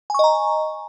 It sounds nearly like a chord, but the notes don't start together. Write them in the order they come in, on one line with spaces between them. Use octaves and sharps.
G#5 C#6 D#5 A#5